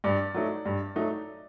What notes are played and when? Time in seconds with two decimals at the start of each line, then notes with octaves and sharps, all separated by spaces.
0.04 G2 D5
0.34 F#3 A3 D#4
0.66 G2
0.96 F#3 A3 D#4